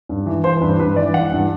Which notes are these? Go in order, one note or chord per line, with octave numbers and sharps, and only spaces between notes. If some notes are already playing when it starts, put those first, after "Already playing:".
G2
E3
E3 C5
G2 B4
G2 B4
E3 D5
E3 F#5
G2